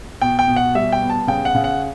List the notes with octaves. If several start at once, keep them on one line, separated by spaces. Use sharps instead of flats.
B2 G5
G5
B2
F#5
G3 E5
G5
B3
A5
C#3 G5
F#5
C#3
F#5